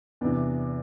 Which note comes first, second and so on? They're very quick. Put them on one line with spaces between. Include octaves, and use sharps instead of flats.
E2 D4 C3 E3